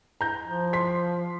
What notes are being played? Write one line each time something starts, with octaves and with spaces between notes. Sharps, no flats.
A#5 G6
F3
C6 B6